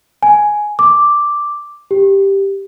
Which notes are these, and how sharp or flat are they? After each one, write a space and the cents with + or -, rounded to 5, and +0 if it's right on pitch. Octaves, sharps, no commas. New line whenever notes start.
G#5 +5
D6 +0
G4 +0